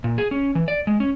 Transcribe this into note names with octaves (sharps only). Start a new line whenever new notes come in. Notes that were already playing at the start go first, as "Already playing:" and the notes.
A#2
G#4
C#4
E3
D5
G#3
C#4